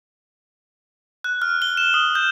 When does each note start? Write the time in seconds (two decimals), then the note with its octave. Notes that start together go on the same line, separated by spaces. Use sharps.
1.24 F#6
1.42 F6
1.62 G7
1.77 E7
1.94 D#6
2.15 G6